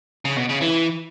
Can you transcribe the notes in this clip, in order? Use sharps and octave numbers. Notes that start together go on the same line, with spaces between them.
C#3
B2
C#3
E3